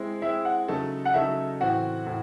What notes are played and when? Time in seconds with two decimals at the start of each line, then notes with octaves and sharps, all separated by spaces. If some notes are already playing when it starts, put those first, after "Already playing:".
Already playing: G#3 C4 E4
0.22 G#3 C4 E4 E5
0.45 F#5
0.68 C#3 F#3 A3 D#4 A4
1.05 F#5
1.14 C#3 F#3 A3 D#4 A4 E5
1.61 A2 E3 C4 F#4 F#5
2.07 A2